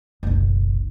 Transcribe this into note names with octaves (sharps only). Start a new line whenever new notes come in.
F#1 B1